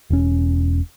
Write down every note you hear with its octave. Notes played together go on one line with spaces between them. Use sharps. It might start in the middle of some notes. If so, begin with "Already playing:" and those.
E1 C#4